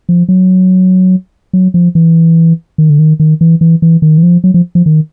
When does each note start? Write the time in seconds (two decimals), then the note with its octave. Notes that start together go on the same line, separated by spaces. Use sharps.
0.09 F3
0.29 F#3
1.53 F#3
1.74 F3
1.95 E3
2.78 D#3
2.90 D3
2.99 D#3
3.20 D#3
3.41 E3
3.61 E3
3.82 E3
4.02 D#3
4.18 E3
4.23 F3
4.44 F#3
4.54 F3
4.75 F3
4.86 D#3